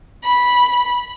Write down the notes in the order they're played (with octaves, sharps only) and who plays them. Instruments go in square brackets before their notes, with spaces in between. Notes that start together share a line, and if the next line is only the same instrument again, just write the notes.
[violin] B5